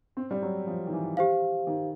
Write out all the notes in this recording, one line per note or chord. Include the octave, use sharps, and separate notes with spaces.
C4
G3
F#3
F3
D#3
E3
G4 C5 F5
D#3